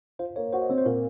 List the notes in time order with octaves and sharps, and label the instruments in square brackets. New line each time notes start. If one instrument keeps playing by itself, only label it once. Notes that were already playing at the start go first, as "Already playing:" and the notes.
[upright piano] F4 [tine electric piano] C5
[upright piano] A#3 [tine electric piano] C#5
[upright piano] F#4 [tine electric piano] C5
[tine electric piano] D#5
[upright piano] C4 [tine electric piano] C#5
[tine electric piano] C5
[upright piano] A#2 [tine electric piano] A#4